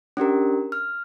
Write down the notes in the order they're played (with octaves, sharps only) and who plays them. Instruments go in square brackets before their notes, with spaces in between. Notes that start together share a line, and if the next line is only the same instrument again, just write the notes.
[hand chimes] C#4 D4 G4 A#4
F6